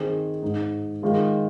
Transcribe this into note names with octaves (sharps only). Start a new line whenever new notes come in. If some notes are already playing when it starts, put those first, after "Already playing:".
Already playing: D#3 C4 G#4
G#2 G#3 D#4
D#3 G#3 F4 G#4